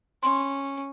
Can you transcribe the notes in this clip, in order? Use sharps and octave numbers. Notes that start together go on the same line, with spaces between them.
C#4 C6